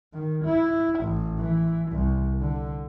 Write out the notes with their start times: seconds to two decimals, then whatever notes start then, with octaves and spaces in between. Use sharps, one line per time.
0.14 D#3
0.45 E4
1.00 A1
1.39 E3
1.92 C2
2.41 D3